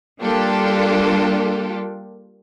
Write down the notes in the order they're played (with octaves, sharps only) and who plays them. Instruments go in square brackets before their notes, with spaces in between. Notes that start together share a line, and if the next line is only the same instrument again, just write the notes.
[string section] G3 A#3 D4 F4 G4 A4